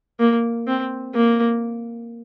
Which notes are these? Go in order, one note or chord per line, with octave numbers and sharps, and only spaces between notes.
A#3
C4
A#3